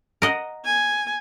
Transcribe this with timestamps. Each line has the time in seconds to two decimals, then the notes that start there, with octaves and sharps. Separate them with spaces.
0.22 A#4 D#5 F#5
0.65 G#5